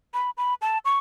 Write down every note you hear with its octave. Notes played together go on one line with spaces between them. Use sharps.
B5
B5
A5
C#6